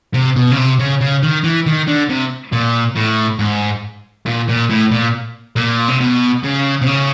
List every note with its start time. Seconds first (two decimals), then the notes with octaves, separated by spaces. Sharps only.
0.14 C3
0.36 B2
0.51 C#3
0.57 C3
0.79 C#3
1.01 C#3
1.23 D#3
1.44 E3
1.66 D#3
1.87 D3
2.09 C3
2.52 A#2
2.96 A2
3.39 G#2
4.26 A#2
4.48 A#2
4.69 A2
4.91 A#2
5.56 A#2
5.88 C3
6.00 B2
6.43 C#3
6.81 C3
6.86 C#3